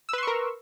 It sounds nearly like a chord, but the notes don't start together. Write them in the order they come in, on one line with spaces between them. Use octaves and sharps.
E6 B4 C6 C#6 A#4